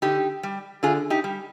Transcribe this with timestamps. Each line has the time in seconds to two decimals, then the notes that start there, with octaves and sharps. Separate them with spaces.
0.02 D3 D#4 G4
0.43 G3
0.83 D3 F4 G#4
1.10 D#4 G4
1.24 G3